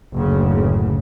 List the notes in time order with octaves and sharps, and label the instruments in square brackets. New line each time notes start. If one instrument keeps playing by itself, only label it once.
[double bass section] F#1 D2 A2 C#3